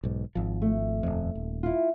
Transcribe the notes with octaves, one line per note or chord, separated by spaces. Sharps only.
B1 G#2
G#1 F3
A3
D#1 G#1 F2
D#1
E4 F4